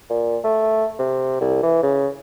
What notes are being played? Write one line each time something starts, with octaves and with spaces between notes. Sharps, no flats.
A#2
A3
C3
C2
E3
C#3